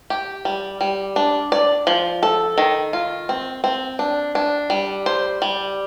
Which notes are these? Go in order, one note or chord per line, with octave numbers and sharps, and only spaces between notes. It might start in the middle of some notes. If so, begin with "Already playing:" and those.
G4
G3
G3
D4
D5
F3
A4
D#3
F4
C4
C4
D4
D4
G3
C5
G3